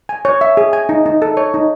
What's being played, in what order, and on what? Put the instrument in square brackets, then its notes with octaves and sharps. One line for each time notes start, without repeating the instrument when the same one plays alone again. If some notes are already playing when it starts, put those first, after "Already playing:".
[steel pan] G#5
C#5
E5
G#4
G#5
D#4
D#4
A4
C#5
D#4